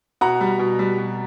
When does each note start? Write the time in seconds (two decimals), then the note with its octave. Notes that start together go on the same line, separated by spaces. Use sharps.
0.21 B2 F#5 A#5
0.41 G3
0.59 B2
0.79 G3
0.98 B2